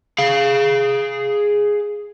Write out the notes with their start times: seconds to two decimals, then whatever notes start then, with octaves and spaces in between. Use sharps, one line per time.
0.18 G#4 F5